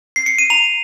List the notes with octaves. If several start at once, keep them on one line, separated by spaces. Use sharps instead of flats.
C7
C#7
D#7
A#5 F7